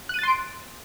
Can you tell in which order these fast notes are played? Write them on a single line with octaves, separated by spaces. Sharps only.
F#6 D#7 A6 C6 D7